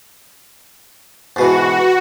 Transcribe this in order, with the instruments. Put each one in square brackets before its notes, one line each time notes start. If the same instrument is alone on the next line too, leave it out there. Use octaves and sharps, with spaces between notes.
[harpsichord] G#2 B2 E3 [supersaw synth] F#4